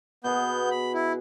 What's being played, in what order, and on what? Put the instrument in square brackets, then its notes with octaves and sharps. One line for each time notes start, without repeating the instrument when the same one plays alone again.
[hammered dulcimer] B2 G#4 [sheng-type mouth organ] B3 G6
[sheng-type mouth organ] B5
E4